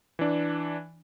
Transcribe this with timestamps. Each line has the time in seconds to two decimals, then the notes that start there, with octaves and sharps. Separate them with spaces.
0.19 E3 D4